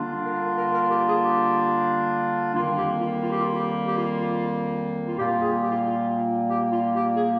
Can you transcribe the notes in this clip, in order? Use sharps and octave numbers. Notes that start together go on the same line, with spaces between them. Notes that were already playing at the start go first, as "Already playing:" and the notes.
Already playing: D3 G3 A#3 D4 F4
A#4
A#4
A#4
G4
G#4
G4
F2 D#3 G3 A#3 F4
G4
F4
F4
G4
F4
G4
G4
F4
F4
F4
A#2 G3 A#3 F4 G4
G#4
G4
F4
F4
G4
F4
G4
G#4